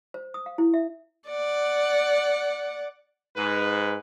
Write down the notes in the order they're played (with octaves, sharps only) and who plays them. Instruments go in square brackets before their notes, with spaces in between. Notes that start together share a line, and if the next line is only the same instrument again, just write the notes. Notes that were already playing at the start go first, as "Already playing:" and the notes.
[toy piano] C5
D#6
F5
E4
E5
[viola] D5 F#5
[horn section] G#2 B4